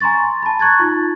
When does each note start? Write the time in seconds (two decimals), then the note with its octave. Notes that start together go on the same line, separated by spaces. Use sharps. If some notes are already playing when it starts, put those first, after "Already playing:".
0.01 G#5 A#5 C6 C#6 A6
0.43 A5 B5
0.59 A#5 C#6 F#6 G#6 A6
0.79 D#4 F4